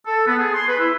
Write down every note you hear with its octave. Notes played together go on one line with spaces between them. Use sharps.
A4
B3
G#4
C6
B4
E4